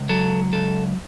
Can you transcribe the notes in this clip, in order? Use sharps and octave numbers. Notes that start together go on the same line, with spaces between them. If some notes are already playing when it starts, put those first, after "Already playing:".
Already playing: C#2
F#3 A4
C#2 A4